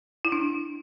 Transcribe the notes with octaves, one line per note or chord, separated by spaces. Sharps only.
E4
D4